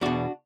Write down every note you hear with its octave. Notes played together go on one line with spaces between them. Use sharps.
E2 B2 D4 F#4